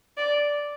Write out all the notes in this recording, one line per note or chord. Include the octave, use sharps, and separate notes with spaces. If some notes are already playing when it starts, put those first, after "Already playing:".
D5